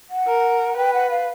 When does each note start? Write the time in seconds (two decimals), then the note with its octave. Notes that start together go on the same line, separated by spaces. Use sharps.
0.10 F#5
0.27 A#4
0.77 B4 G5
0.94 F#5
1.10 F5